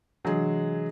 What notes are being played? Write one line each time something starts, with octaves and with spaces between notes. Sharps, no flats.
C3 E3 F#3 G#3 D4 G#4